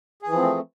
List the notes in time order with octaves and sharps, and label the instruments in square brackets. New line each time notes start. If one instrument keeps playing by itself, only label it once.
[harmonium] G#4
E3
F3
C4
A3